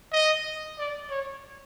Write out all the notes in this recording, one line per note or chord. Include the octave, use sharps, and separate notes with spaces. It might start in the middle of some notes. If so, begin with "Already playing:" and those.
D#5
D5
C#5